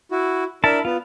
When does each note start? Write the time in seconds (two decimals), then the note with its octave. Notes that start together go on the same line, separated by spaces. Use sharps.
0.11 E4 F#4
0.64 D4 E4 A#4 A5 B5
0.85 B3 F4